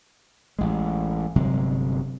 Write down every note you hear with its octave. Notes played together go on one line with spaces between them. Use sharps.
A1 G#3
G1 C3 F#3 G#3